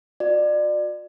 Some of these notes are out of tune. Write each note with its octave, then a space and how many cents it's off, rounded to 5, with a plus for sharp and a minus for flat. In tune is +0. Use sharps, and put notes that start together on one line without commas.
F#4 -45 D5 +30